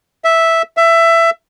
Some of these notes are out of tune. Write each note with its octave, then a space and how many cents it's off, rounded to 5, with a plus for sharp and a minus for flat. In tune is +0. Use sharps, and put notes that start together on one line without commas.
E5 -5
E5 +15